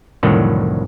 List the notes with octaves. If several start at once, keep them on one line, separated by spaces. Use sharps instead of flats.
C2 F2 A2 D3 D#3 F#3